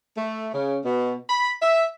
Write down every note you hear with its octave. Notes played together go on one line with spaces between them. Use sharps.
A3
C#3
B2
B5
E5